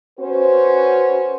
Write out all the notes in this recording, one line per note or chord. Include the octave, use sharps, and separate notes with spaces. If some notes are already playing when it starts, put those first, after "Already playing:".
C#4 F#4 B4 C5